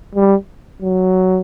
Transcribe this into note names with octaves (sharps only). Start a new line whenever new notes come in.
G3
F#3